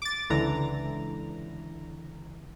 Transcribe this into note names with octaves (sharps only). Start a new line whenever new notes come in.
D6 A6
C#2 D3 E3 A#5